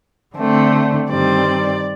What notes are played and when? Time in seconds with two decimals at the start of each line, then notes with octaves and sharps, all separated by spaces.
0.37 D3 A3 C4
1.09 G2 D#3 G3 C4 D5